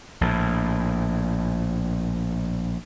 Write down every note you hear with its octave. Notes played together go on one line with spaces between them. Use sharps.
A#1 A2